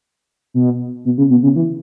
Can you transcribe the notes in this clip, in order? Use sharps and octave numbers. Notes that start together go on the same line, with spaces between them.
B2
B2
C#3
B2
C#3
E3